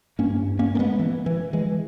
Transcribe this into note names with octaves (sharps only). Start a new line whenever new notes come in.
G2 A#3 C#4
A#3 C#4
A#3
G#3 B3
E3
E3
E3 G#3